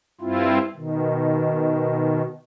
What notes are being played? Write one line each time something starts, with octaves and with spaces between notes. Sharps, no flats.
G2 C4 E4 F4
B2 D#3